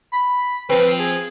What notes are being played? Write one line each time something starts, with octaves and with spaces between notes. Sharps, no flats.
B5
F3 C4 B4
G#4